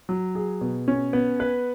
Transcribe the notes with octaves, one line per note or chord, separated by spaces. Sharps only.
F#3
G#4
B2
C#4
B3
B4